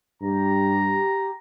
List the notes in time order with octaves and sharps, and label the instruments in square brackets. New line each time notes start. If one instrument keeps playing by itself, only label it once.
[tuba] G2 [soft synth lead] G4 [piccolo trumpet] A#5